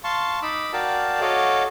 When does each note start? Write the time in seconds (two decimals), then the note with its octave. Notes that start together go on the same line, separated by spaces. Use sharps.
0.04 F5 A5 C6 C#6
0.42 D#4 B5 D6 E6
0.73 F#4 A#4 D5 F5 G5 A5
1.21 F#4 A4 C#5 D#5 F5 D6